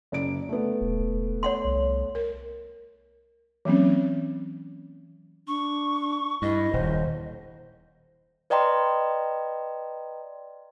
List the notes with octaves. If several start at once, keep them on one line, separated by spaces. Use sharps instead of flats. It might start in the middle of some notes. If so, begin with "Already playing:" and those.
F#1 D5 D7
A3 B3
E1
E1
C#5 F#5 C6
C2
A#4
E3 F#3 A#3 C4 C#4
D4 C#6
G2 E4 D#5
D#1 C5
B4 D5 D#5 G5 A#5 C6